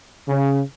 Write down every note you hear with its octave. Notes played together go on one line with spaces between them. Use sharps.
C#3